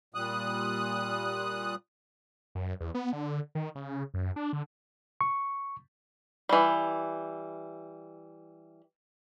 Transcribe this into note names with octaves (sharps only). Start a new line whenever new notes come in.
A#2 G3 D#6 F#6
F#2
E2
B3
D3
D#3
C#3
F#2
D4
D3
C#6
E3 G3